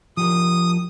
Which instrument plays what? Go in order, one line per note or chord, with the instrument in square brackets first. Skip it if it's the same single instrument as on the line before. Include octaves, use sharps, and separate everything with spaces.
[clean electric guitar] F3 G4 A#4 [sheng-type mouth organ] D#6